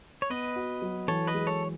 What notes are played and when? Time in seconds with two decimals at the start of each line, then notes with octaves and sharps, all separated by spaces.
0.22 C#5
0.30 B3 B4 D#5
0.56 F#4
0.82 F#3
1.08 E3 A4 C#5
1.27 B4 D#5
1.34 G#3
1.47 A4 C#5